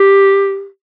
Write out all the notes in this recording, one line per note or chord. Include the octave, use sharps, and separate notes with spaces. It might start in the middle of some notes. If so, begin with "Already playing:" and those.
Already playing: G4